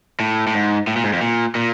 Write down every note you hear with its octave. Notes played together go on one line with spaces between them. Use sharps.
A2
A2
G#2
A2
A#2
G#2
F2
A#2
A#2